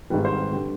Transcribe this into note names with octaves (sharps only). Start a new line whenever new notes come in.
G#1 G#2 D#3 G3 B4
C5
B4
D3 G3